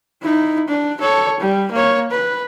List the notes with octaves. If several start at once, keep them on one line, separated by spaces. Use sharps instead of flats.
D#4 E4
D4
A4 C#5
G3
A#3 C#5
B4